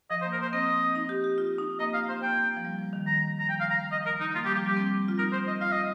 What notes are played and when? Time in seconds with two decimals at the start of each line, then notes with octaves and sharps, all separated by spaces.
0.10 F3 D#5
0.21 C5
0.25 A#3
0.32 A#4
0.39 A#3 C5
0.53 C4 D#5
0.95 D#4
1.09 G4
1.24 G4
1.38 F4
1.58 D#4
1.79 A#3 D#5
1.94 F5
2.09 C5
2.22 A#3 G5
2.57 F3
2.65 G3
2.78 F3
2.93 D#3
3.07 D#3 A#5
3.39 A#5
3.49 F3 G5
3.60 F5
3.70 A#5
3.92 D#5
4.06 A#4
4.20 D#4
4.34 A#3 F4
4.44 G3 G4
4.55 F3 G4
4.66 G3 G4
4.77 C4
5.08 F4
5.18 D#4 A#4
5.32 C5
5.47 D#5
5.61 F4 F5
5.72 D#5